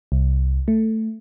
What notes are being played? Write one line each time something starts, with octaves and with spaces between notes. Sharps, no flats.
C2
A3